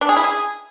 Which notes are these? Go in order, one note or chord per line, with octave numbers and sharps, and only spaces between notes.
D4
G#4
E4
G#4